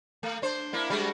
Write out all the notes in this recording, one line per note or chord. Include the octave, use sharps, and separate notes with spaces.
A3
D4 C5
A#3 D4 E4
G3 G#3 F#4